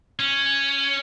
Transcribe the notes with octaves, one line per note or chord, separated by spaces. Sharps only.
C#4